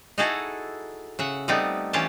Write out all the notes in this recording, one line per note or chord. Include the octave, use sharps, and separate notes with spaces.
D#4 E4 F#4 G#4 A4 D#5
C#3 E5 F#5
G3 A3 B3 C4 D#4
E3 C#4 F4 G4 A5